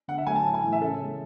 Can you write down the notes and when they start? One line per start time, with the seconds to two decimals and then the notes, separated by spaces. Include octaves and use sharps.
0.08 D3 F#5
0.18 E5
0.26 F#3 A3 G#5
0.36 A5
0.45 A2
0.54 G#5
0.64 E3 A3
0.73 E5
0.81 C#3 A4
1.00 E3 G#3